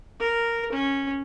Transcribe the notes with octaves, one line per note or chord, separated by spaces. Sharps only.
A#4
C#4